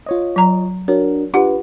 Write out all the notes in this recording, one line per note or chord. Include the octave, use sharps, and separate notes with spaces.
F4 C#5 D#5
F#3 A#5
D4 F#4 A#4 C#5
D4 F4 G4 B4 F#5